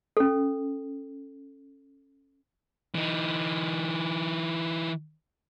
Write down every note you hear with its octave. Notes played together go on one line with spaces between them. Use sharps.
C#4 A4
E3 D#4